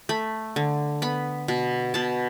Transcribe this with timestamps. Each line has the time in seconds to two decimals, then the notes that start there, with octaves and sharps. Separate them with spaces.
0.09 A3 B5
0.56 D3
1.02 B3 B5
1.48 B2
1.94 B2 A5